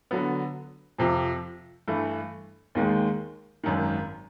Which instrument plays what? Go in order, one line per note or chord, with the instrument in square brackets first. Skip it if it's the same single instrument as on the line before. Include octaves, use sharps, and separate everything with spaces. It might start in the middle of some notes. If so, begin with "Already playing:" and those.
[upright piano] D3 F#3 B3
F2 C3 F3
G2 E3 A3
D#2 D#3 G#3
G#1 F#2 D#3